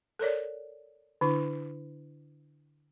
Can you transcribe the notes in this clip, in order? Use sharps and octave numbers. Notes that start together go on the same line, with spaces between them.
A4 A#4 C#5 D5
D3 D4 E4